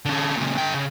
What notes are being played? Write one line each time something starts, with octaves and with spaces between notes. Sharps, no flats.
D3 C#4
A#2 C#3
D3 G5
C#3